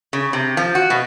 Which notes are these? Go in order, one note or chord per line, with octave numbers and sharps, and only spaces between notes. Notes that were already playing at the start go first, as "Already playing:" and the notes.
C#3
C3
F3
F#4
B2